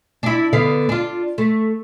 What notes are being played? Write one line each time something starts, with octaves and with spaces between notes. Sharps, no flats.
D4 E4
D3 B3 F5
D4 F4
A3